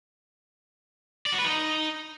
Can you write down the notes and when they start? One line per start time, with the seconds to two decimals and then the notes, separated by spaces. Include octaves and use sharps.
1.26 D5
1.32 F#4
1.38 B4
1.44 D#4